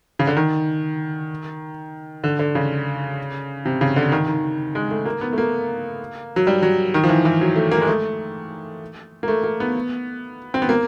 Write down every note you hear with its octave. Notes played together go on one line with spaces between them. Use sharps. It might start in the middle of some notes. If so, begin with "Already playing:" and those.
C#3
D3
D#3
D3
D3
C#3
C3
C#3
D3
D#3
D#3
G#3
A3
A#3
B3
A3
A#3
F#3
G3
F#3
D#3
F3
E3
E3
F#3
A3
A#3
G#3
A3
A#3
A3
A#3
B3
C4
B3
A#3